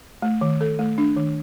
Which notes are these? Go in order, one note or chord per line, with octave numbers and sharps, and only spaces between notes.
A3
D#3
A4
A3
D4
D#3